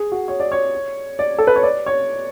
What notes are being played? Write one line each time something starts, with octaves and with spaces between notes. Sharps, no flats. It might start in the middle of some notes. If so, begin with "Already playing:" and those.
Already playing: G#4
F#4
C#5
D5
C#5
D5
A4
B4
C#5
D5
C#5